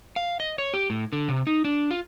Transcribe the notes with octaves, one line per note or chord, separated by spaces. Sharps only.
F5
D#5
C#5
G4
A2
D3
C3
D#4
D4
F4